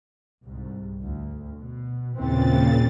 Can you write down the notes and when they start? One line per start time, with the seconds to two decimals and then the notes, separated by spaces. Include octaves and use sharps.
0.44 C2 G#2
1.00 D2
1.58 B2
2.16 D#2 A#2 C#3 E3 C4 A6